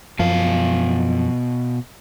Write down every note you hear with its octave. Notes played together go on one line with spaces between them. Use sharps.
F#2 B2 F3 F5